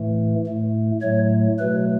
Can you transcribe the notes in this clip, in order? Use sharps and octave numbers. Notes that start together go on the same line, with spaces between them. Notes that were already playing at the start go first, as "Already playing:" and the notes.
Already playing: A2 E3 A3
A2 A3
A2 F#3 A3 C#5
B2 F#3 A3 B4